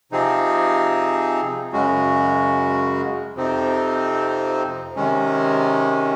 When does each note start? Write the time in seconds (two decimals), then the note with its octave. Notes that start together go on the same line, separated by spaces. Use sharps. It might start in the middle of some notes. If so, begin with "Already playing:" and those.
0.12 C3 F3 C4 D#4 G#4
1.73 F#2 C#3 G#3 C#4 F#4
3.34 F2 C3 F3 C4 D#4
4.96 C3 D#3 G#3 C#4